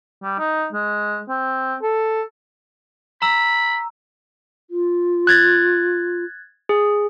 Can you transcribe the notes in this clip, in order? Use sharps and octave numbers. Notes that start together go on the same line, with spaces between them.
G3
D#4
G#3
C4
A4
A#5 B5 E6
F4
F#6 G#6 A6
G#4